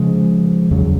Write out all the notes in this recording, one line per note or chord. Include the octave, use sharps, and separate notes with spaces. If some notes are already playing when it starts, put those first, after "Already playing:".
Already playing: C#3 F3 G#3
E2 C#3 F#3